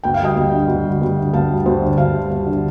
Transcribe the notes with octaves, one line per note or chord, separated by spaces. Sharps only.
D2 G5
F5
G3 D#5 G5
D2
D3
D2
G3
D2
D3
D2 F5 A5
G3
D2 C5
D3
D2 F5 A5
G3
D2
D3